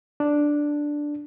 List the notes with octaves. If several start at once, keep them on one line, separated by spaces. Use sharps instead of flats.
D4